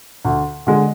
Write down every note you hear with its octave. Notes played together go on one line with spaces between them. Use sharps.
D2
D3 G#3